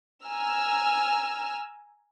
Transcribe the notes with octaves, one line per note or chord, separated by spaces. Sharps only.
G#5 A#5 E6 F6